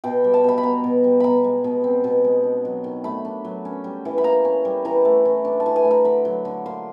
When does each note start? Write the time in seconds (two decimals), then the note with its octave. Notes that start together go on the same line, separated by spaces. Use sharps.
0.04 B2 G5
0.24 G3
0.34 A5
0.44 B2 B5
0.58 B5
0.63 B3 A#5
0.84 B2
1.04 G3
1.20 B2 A#5 B5
1.44 G#3
1.64 B2
1.84 C4
2.04 B2
2.24 G#3
2.44 D4
2.65 F#3
2.84 D#3
3.04 A3 B5
3.25 D4
3.45 F#3
3.65 C#4
3.84 G3
4.05 E3
4.18 B5
4.24 A#3 A#5
4.45 C#4
4.65 G3
4.85 E3 A#5
5.05 A3
5.25 E3
5.45 D4
5.60 A5
5.66 E3
5.76 G#5
5.85 A3
5.91 A#5
6.05 D3 B5
6.25 F#3
6.45 D3
6.66 A#3 C6